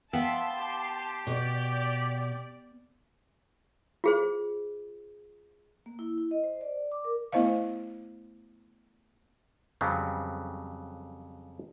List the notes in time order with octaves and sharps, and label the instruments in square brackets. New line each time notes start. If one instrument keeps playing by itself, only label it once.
[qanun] B3 [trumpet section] E5 [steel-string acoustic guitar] F5 G5 [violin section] A5 C6
[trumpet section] G4
[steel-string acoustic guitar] B2 [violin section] D5
[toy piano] F4 G#4 C5
[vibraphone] A#3
E4
E4
D#5
C5
D5
D6
A#4
[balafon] A3 B3 E4 C5 D#5 F5
[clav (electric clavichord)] F2 C#3 F#3 G3 B3 C4